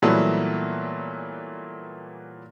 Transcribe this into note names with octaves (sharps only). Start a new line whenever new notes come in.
A#2 E3 F#3 G3 A3 B3